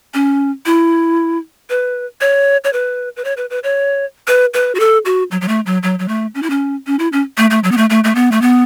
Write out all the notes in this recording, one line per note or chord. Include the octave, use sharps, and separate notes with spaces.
C#4
E4
B4
C#5
C#5
B4
B4
C#5
B4
B4
C#5
B4
B4
F#4
A4
F#4
F#3
F#3
A3
F#3
F#3
F#3
A3
C#4
E4
C#4
C#4
E4
C#4
A3
A3
F#3
B3
A3
A3
A3
B3
A3
B3